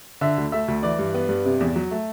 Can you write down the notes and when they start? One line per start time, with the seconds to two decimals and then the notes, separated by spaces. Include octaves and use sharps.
0.21 D3 E5
0.38 D2
0.52 A3 E5
0.68 D2
0.83 E3 D5
0.99 G2
1.14 B3
1.29 G2
1.45 C3
1.60 E2
1.76 F#3
1.91 A3